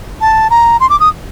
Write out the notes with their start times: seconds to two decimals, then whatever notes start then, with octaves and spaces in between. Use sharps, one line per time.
0.21 A5
0.50 A#5
0.80 C6
0.90 D6
1.00 D#6